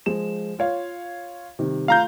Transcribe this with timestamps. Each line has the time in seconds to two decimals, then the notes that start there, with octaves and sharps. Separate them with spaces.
0.06 F3 G#3 E7
0.59 F4 C#5 F5
1.59 C3 D#3 G3
1.88 A3 F4 F5 A#5 G6